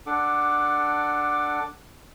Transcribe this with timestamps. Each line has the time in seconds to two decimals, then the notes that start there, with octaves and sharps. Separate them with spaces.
0.06 D4 A4 F#5 D6